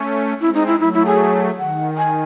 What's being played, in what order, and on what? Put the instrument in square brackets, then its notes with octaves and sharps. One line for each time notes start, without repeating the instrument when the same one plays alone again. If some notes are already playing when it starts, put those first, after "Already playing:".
Already playing: [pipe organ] A3 C#4
[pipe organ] G#3 C4 [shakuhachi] E4
[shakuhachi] D#4
E4
[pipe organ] F#3 A3 [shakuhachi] E4
[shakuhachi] E4
G#4
[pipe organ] D#3 [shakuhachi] F#5
[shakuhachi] G#5